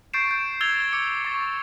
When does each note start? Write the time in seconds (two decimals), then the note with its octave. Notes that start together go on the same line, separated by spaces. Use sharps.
0.13 C#6 G6 A6 C7 D7 E7
0.31 G6
0.61 E6 G#6 A6 F7 G7
0.93 D6 C#7
1.25 C#6 A6